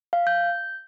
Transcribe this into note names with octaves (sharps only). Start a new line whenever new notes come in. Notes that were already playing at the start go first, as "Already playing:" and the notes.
F5
G6